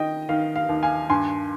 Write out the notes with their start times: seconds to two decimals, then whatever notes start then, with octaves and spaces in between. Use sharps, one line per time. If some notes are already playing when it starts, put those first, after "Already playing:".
Already playing: D#3 D#5 G5
0.29 D#3 F5
0.56 F5
0.69 D#2
0.83 F5 G#5
1.10 G2 G#5 C6